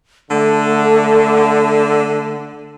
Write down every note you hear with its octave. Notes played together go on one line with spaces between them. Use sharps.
D3 A3